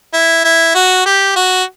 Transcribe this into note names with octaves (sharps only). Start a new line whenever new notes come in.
E4
E4
F#4
G4
F#4